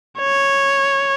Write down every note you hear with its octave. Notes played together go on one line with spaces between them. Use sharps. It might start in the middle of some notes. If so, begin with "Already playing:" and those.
C#5